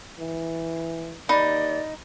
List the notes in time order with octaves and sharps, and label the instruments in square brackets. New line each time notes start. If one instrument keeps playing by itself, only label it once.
[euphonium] E3
[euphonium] D#2 [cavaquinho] D#4 [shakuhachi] D5 [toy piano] B5